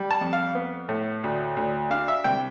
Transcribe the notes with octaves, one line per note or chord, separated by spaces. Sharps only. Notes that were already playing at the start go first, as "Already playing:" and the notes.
Already playing: G3
A5
F2
F5
B3
A2
D2
D2
D4 F5
E5
C2 G5